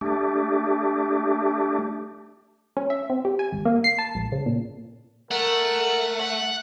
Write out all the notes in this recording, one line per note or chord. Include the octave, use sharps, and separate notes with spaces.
A3 D4 G4
C#4
E5
C4
G4
G#5
G#1
A#3
C7
A5
A#1
C#3
A#2
A3 A#4 F#5
F#5